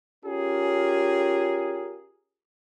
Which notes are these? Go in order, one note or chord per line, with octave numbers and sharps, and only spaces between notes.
C#4 F4 G4 G#4 A#4